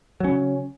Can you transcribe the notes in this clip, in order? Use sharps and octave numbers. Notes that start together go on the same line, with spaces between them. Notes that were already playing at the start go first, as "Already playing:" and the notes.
C#3 F#3 C#4